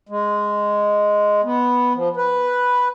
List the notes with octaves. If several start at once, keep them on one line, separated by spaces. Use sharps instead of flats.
G#3
B3
F3
B4